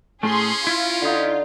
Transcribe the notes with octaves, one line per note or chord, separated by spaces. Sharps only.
A2 A3 C#4 G#4 C6
E4 F4
D3 D#4